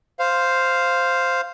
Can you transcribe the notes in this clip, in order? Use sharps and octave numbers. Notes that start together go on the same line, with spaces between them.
C5 F5